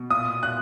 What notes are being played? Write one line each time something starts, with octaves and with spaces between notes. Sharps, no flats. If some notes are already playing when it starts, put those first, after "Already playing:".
Already playing: B2
A#2 D#6
A#2 F#6